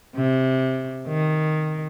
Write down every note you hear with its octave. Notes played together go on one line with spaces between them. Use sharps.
C3
D#3